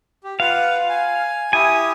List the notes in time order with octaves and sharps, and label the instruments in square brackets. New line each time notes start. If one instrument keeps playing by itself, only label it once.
[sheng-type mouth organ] G4
[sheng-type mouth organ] F4 B4 F#5 [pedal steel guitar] F5
[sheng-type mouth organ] G#5
[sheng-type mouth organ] E4 G4 D#6 [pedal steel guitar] G#5